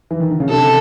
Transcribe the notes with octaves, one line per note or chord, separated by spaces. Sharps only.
E3
D#3
D3
C#3
C3 A4